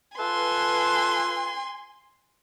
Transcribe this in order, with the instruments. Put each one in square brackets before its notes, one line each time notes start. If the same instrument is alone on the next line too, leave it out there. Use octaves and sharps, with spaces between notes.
[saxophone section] F4 A4 B4 [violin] G#5 C6